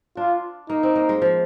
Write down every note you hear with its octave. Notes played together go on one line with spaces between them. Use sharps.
D4 F4
A#3 D#4
C4
A#3
G#3
F3